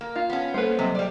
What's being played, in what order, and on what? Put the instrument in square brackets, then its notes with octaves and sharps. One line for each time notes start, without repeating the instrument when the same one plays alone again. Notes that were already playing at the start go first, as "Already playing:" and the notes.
[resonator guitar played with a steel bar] A#3
[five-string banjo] F4
[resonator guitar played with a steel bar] B3 C#4
[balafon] G3 A#3 A4 [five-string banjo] B4 C5
[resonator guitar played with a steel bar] C3 [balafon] F#3
[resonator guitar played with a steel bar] G3 D5